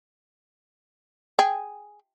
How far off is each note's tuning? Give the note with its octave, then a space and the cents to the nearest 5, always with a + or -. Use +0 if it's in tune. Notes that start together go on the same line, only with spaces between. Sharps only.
G#4 +0 G5 +0